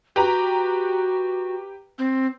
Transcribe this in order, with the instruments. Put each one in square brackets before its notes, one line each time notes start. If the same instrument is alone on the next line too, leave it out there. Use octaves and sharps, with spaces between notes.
[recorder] F#4 [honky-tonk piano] G4 B4 A#5
[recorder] C4